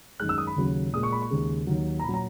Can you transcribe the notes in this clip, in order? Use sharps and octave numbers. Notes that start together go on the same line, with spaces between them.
F#2 D#3 G#3 F#6
E6
D#6
B5
D#2 C#3 F#3
A#2 G#3 D#6
C#6
B5
C#6
D#2 C#3 G#3
D#2 D#3 F#3
A#5
A#2 F#3 B5
A#5